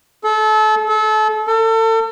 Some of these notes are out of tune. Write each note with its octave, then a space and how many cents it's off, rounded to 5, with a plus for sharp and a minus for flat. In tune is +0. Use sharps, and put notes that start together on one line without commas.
A4 -30
A4 -30
A4 +35